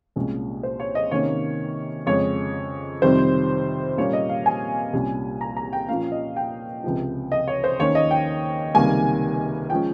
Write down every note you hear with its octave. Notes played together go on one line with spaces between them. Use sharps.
C2 A#2 G#3 C#4
C5
C#5
D#5
C3 D#3 A#3 C#4 C#5
F2 C#3 G#3 C#5
F2 C3 D#3 G3 C4 C5
A#2 G3 A#3 C#4 C#5
D#5
F5
G#5
C2 A#2 G3 C#4
A#5
A#5
G5
A#2 F3 A#3 C#4 F5
D#5
G5
C#2 C3 F3
D#5
C#5
C5
D#2 D#3 A#3 C#4 C#5
D#5
G5
C#2 C3 D#3 G3 A#3 G#5
F3 G#3 C#4 G5